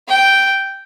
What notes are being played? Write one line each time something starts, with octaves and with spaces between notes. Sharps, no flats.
G5